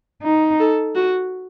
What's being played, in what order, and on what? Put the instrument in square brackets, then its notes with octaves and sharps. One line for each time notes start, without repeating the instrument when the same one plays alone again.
[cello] D#4
[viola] A4
F#4